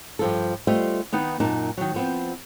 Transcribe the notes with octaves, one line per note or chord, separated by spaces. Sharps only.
G2 F3 A4
G3 A3 F4 C5 D#5
D#3 B3 D#4
F#2 A#2 D#4 A5
D#3 F#3
F3 B3 C4